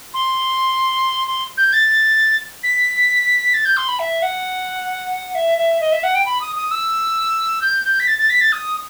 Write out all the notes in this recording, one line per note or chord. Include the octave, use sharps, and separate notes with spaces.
C6
C6
G6
A6
B6
A6
G6
C6
B5
E5
F#5
E5
E5
D#5
E5
F#5
G5
B5
D#6
D#6
E6
G6
G6
B6
A6
A6
B6
A6
D#6